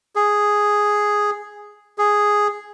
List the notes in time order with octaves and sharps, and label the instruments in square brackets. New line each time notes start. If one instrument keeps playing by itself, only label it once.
[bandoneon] G#4
G#4